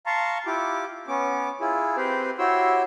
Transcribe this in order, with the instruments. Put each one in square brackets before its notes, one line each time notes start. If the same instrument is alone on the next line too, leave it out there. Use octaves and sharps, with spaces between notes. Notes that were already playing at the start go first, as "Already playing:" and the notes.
[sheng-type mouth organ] F5 A5 A#5 C6 C#6
E4 F4 G4 D6
B3 C#4 D6
E4 F4 G#4
C4 G4 B4 C5
E4 F#4 G4 C#5 C6 E6